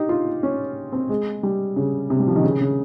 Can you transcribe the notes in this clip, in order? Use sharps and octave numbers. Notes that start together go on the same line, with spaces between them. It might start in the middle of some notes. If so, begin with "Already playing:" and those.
Already playing: D#4 G4
F4
C#4
C4
G#3
G3
C#3
C3
G3
F3
D#3
C#3
C#3